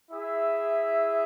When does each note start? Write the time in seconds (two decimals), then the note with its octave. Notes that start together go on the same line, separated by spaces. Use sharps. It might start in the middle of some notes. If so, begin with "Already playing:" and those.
0.10 E4 G#4 E5